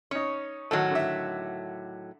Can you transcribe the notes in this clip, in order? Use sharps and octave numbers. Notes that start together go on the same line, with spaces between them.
C#4 D#4 C#5
A2 D#3 F#3 F#4 A4
D3 E5